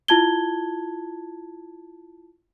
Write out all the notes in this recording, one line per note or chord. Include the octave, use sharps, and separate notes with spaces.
E4 F4 A5 G#6 G7